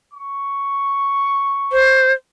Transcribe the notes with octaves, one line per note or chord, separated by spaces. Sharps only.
C#6
C5